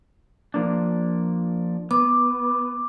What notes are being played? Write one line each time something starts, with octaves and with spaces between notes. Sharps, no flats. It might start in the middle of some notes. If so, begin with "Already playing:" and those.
F3 A#3 D4
B3 D6